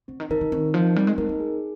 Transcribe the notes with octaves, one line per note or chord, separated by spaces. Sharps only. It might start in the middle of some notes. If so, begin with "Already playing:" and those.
D3 C4
D#3
D#3 D#4 A#4
D#3
D#3 C4
F3 D#4 A#4
G3 C4
G#3
G#3 D#4 A#4
A#3
G#4